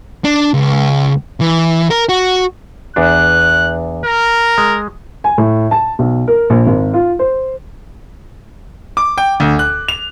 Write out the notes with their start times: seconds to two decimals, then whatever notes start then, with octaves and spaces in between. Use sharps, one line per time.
0.24 D4
0.54 C#2
1.41 E3
1.90 A#4
2.09 F#4
2.96 E2 D4 F#6
4.05 A#4
4.58 G#3
5.24 G#5
5.38 A2
5.71 A5
5.99 B1
6.28 A#4
6.50 A#1
6.67 G#1
6.94 F4
7.19 C5
8.97 D6
9.18 G5
9.40 D2
9.59 F#6
9.88 F7